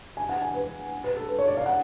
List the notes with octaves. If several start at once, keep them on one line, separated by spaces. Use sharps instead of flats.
G#5
F#5
G#5
B4
B4
A4
B4
C#5
D5
F5
F#5